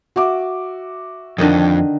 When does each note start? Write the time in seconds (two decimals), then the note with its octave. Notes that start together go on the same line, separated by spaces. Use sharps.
0.16 F#4 E5 D6
1.38 F2 D3 D#3 D#5